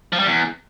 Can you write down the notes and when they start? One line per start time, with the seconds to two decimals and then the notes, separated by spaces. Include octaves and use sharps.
0.13 F3
0.19 G3
0.26 E2